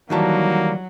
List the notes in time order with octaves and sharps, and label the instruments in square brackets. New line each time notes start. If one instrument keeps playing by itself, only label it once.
[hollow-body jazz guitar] D#3 E3 G3 [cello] F#3 [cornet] A#3 [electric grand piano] D#4 F#4 A5